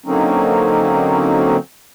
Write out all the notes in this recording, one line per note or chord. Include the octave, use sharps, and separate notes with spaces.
D3 F#3 A#3 C4 C#4 D#4